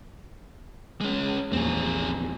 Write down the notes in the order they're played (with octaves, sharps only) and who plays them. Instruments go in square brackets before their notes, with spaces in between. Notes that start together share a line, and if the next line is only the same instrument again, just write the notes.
[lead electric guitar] G#3 C#4
[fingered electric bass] A#1 E2 A#3 [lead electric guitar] C4 G#4